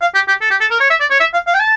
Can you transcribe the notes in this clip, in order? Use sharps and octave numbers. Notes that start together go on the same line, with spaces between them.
F5
G4
G4
A4
G4
A4
A#4
C#5
E5
D5
C#5
E5
F5
F5
G5
A5